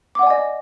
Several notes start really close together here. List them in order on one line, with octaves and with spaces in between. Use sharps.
D6 F#5 D5 G#5 D#5